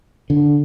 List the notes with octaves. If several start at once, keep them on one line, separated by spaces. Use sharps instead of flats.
D3